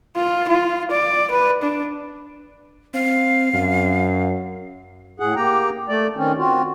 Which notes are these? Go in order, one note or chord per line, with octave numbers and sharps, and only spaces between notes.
F4
F4
D5
B4
D4
C4 F5
F#2
A2 G#4 F#5
A#3 G4 G5 A#5
A3 D5
D#3 C4 C#4
C4 F4 F#4